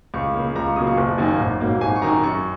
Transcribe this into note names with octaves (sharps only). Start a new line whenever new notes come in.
C#2 C#6
C#3 A#3
C#2 A#5
C#6
C#3 F#3 A#3 D#6
C#6
F#1
F#2 D#3 A#3
G#1
G#2 F#3 A#3
G#1 G#5
C#6
F#2 D#3 A#5
F#2 C#6